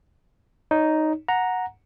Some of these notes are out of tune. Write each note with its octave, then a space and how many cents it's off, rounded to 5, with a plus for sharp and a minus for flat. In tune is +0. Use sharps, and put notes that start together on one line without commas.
D#4 +0 C#5 +30
F#5 -10 A#5 +0